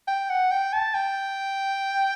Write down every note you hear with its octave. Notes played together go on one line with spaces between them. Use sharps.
G5
F#5
G5
A5
G5